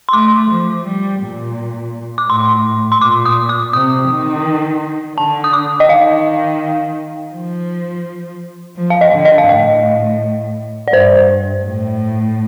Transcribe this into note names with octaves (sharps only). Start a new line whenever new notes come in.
C6
A3 D6
F3
G3
A#2
D6
A2 C6
C6
A#2 D6
D#6
D6
C3 D#6
D#3
D3 A5
D#6
D6
D#5
D#3 F5
F3
F3
F5
D#5
D3
D#5
F5
A2 D#5
D5
G2 C5
A2